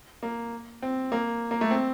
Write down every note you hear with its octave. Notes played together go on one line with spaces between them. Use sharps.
A#3
C4
A#3
A#3
A3
C4